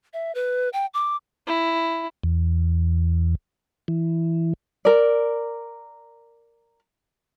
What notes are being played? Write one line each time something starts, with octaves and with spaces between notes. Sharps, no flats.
E5
B4
G5
D6
E4
E2
E3
A#4 D5